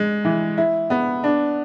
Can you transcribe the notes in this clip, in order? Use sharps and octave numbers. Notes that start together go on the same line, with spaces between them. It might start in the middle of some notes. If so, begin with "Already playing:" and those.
Already playing: G#3
E3
E4
B3
D4